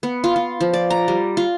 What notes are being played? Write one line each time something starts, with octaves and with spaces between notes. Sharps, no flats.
B3
F4
F4
F3
D5
A#5
G3
F4